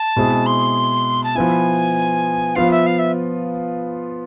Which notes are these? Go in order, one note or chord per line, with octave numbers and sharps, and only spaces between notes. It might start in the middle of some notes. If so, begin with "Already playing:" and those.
Already playing: A5
B2 G#3 C4 E4 G#4
C6
A5
F3 B3 E4 G#5
F3 B3 F4 F5
E5
F5
E5